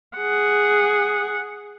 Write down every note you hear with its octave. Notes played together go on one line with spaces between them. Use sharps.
G#4 F#5